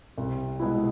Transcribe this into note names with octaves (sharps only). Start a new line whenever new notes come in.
C2
B2 G#3 B3 E4